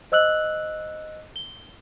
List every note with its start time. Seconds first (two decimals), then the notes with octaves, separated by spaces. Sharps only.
0.12 C5 D#5 E6 F#6 F#7
1.36 G7